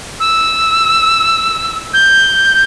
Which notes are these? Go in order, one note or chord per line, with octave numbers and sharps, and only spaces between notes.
E6
G6